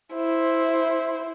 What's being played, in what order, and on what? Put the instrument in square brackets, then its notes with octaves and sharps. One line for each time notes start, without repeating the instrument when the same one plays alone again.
[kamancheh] E4 C5